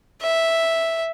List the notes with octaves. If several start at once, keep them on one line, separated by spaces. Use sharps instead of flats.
E5